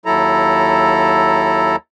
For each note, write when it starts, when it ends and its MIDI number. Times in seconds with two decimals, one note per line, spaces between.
0.06 1.76 39
0.06 1.76 54
0.06 1.76 64
0.06 1.76 69
0.06 1.76 82